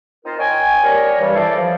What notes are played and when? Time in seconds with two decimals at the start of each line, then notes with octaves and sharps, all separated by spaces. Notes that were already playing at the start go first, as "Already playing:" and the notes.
0.25 C4 D#4 F4 A#4 C5
0.39 C#5 D#5 G5 G#5
0.83 G3 A#4 C#5
1.20 G2 E3 G3
1.35 E4 A4 C5 D5
1.57 F3